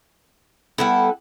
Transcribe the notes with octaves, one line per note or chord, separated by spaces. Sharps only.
G3 B3 E4 A4